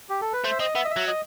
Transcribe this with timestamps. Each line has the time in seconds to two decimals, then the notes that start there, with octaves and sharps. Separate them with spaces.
0.10 G4
0.21 A4
0.33 B4
0.44 A3 C5
0.51 E5
0.60 C4 D#5
0.75 B3 E5
0.85 D#5
0.91 E5
0.96 F#3
1.07 D#5